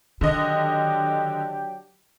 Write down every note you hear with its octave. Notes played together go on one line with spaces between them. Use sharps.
D3 D#3 F#3 D4 G4 D#5